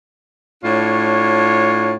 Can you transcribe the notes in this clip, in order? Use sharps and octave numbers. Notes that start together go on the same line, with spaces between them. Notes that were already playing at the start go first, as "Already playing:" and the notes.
A2 D4 F4 C#5